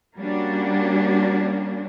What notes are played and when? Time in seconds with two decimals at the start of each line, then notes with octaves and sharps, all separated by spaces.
0.16 G3 A#3 C#4 D4 F#4